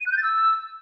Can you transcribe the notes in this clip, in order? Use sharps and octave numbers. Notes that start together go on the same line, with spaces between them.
D#7
F#6
G6
A6
E6